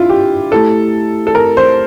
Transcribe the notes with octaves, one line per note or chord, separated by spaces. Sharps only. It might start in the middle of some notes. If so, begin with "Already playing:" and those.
Already playing: D4 E4 F4
G4
A3 E4 G4 A4
A4
A#4
C5